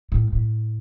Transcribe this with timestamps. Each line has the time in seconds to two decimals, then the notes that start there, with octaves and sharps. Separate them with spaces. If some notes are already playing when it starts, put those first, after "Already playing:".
0.12 A2
0.32 A2